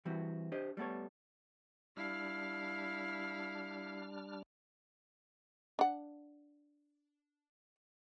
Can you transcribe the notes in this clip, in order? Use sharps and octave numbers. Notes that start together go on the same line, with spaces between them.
E3 G3 C4 E4 F#4
D4 G4 C5 D#5
G3 A3 B3 A4 C#5
G3 D4 E4 F5 F6
D4 F#5